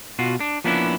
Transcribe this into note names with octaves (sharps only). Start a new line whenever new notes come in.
B2 F4 F#4
D4
F3 A#3 B3 C#4 D4 E4